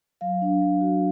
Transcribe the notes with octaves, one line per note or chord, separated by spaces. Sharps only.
F#3 F5
D4
F#3
F#4